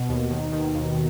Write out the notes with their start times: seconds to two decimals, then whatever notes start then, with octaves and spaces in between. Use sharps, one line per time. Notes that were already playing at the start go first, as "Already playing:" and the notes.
Already playing: B2
0.09 D#2
0.30 D#3
0.53 D#3
0.74 D#2